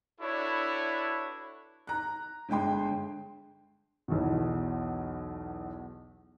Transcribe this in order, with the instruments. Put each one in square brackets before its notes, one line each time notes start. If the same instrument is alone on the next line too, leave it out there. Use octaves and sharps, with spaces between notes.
[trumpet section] D4 E4 F#4 A4 B4 C#5
[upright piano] A#5 F#6
G1 D3 G#3 G5 C6
B1 E2 B2